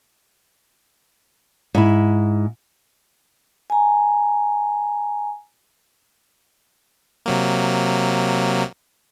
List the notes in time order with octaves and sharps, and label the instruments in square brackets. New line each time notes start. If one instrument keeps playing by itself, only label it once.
[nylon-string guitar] G#2 E4
[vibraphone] G#5 A#5
[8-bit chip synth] C3 F#3 A#3